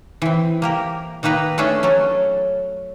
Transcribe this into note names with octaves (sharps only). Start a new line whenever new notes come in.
E3 C4
A#3 G4 A#4
D#3 A#3 D#4 B4 A#5
A3 C#4 D4 G#4 A4 E5
F#3 C#4 A4